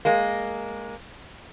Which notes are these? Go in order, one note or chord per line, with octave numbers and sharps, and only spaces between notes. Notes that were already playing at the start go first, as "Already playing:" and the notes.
G#3 A#3